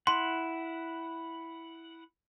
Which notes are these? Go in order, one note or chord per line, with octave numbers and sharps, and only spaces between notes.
E4 F#5 C6